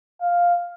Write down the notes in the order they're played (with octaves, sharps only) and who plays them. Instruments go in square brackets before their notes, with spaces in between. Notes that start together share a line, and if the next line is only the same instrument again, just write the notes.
[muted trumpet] F5